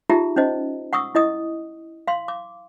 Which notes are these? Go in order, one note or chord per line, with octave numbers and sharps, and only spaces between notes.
D#4 F4 G4 G#4 E5 A#5
C#4 D#4 C5 D#5
F#5 C#6 D#6 E6
E4 D#5 D#6
F5 C6
D6